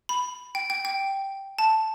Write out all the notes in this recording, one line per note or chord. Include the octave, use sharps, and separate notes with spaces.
B5
G5
G5
G5
A5